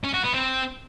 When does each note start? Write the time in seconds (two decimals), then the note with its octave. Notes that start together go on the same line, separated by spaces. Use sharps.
0.04 C#4
0.14 F#4
0.24 B3
0.34 C4